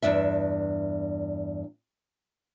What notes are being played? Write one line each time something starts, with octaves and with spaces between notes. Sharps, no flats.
E2 G2 D4 E5